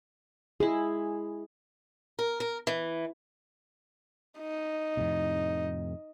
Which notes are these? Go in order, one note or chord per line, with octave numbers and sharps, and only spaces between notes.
G#3 E4 G#4
A#4
A#4
E3
D#4
F2 A2 C3